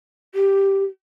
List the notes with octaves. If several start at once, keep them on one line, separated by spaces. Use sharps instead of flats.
G4